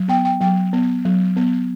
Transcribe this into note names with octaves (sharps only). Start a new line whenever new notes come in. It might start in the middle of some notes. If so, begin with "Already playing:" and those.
Already playing: F#3
B3 G5
G5
F#3 G5
B3
F#3
B3